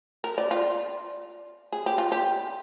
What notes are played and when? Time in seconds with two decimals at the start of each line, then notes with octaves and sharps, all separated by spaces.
0.24 A#4
0.38 D5
0.51 F4
1.72 G#4
1.86 G4
1.98 F4
2.12 G4